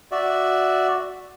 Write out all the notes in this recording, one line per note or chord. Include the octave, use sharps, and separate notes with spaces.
F#4 D5 E5